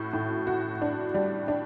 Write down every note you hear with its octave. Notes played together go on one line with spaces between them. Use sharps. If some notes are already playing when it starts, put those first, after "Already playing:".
Already playing: A2 F#4
A2
F#4
D4
G3
D4